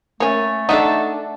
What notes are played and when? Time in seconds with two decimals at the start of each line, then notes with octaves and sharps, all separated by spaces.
0.20 A3 A#3 C#4 C#5
0.69 D4 D#4 A4 E5 F#5